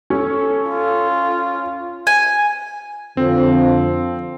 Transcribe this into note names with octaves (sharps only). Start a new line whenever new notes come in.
C#4 A4
F4
G#5
F2 D3 F3 C4